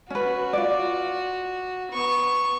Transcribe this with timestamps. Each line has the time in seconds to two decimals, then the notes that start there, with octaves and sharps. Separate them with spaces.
0.10 C#4 F#4 B4
0.53 F4 D5
1.91 B3 C#6